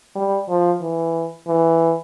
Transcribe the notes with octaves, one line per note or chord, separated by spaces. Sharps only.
G3
F3
E3
E3